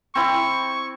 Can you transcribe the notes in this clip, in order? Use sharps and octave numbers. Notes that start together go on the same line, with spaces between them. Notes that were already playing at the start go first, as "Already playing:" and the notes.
C4 E4 C#6